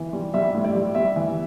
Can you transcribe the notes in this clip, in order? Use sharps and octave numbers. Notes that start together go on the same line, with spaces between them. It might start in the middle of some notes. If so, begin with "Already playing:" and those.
Already playing: E3
G3
G3 E5
A2
D5
G3
G3 E5
E3